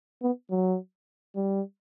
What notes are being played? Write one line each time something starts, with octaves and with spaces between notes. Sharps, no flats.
B3
F#3
G3